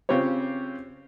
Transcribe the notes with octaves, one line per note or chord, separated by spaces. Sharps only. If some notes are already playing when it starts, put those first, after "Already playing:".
C#3 C4 F4 G4 C#5